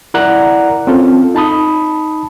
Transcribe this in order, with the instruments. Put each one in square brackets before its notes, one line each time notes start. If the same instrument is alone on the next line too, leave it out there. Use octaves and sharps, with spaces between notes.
[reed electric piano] E4 A#4 D5 F#5 A#5 F#6
C4 C#4 F4 A4
D#4 A5 B5 D#6